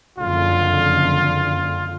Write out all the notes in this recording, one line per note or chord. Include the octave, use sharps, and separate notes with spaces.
F#1 F2 D3 F4